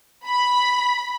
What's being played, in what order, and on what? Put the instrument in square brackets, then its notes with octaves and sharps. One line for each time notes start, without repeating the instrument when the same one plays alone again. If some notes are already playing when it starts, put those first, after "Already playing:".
[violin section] B5